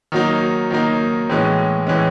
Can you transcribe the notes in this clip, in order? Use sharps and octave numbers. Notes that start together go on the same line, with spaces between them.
D#3 F#3 A#3 D#4
D#3 F#3 A#3 D#4
A2 E3 G#3 C#4
A2 E3 G#3 C#4